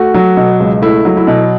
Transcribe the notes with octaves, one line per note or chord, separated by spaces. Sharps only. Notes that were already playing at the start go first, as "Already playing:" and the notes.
Already playing: A3 F#4
F#3
B2
C#2
A3 E4
F#3
E4
B2